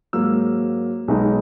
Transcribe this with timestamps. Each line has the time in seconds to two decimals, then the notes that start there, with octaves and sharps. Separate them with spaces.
0.13 G#2 F#3 A#3 E6
1.08 B1 B2 G#3 B3 D#4